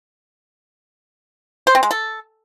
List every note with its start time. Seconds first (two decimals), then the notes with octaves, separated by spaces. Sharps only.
1.67 C5
1.75 C4
1.83 G#3
1.91 A4